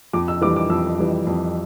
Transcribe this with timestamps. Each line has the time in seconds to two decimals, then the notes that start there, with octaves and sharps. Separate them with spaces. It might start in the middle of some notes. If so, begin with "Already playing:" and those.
0.13 F2 D6
0.28 E6
0.41 E3 G3 D6
0.56 D6
0.70 F2 E6
0.99 E3 G3
1.27 F2